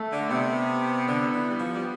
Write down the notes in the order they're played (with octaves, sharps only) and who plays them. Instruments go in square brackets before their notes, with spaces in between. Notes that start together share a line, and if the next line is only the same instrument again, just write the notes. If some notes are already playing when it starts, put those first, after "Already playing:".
Already playing: [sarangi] A3
[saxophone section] D3
[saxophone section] C3 [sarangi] B3
[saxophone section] D3
E3
G3
F3
G3